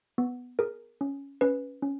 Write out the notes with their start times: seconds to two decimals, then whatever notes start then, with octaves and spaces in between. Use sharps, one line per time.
0.18 B3
0.59 G#4 A#4
1.01 C#4
1.41 C#4 B4
1.82 C#4